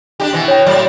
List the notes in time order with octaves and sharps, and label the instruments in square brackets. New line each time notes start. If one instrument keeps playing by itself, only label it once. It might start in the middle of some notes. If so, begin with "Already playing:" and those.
[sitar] D4 D#4 G4
B2 E3
[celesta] C#5 G5
[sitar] A2 F#3 D5